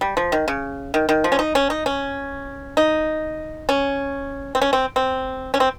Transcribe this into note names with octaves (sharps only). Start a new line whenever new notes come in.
G3
F3
D#3
C#3
D#3
D#3
F3
C#4
D#4
C#4
D#4
C#4
D#4
C#4
C4
C#4
C4
C4
C#4
C4